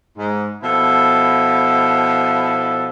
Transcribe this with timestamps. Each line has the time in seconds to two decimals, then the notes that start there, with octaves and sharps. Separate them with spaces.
0.18 G#2
0.62 B2 F3 E4 A4